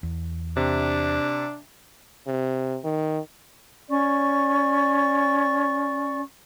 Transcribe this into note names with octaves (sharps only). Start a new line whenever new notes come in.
E2
C3 D4
C3
D#3
C#4 D5 C#6